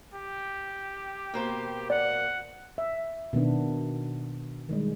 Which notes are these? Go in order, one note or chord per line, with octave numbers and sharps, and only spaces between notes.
G4
B2 A#3 C5
D5 F#5
E5
B2 D#3 B3 D4
D#3 G3 G#3